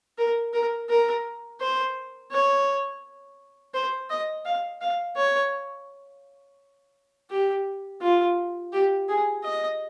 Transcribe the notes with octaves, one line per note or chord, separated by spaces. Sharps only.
A#4
A#4
A#4
C5
C#5
C5
D#5
F5
F5
C#5
G4
F4
G4
G#4
D#5